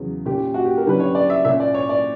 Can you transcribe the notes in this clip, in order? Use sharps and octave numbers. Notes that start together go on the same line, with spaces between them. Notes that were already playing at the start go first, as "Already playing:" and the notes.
Already playing: E2 C#3 F#3
A#2 A#3 C#4 G4
F#4
G4
A#4
F#2 D3 G3 C#4 B4
C#5
D5
E5
A#2 A#3 C#4 E5
D5
C#5
D5